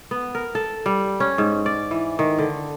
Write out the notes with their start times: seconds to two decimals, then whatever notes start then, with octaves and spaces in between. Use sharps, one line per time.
0.11 B3
0.35 A#4
0.55 A4
0.86 G3
1.20 C#4
1.38 G#2
1.66 D5
1.91 E3
2.19 D#3
2.39 D3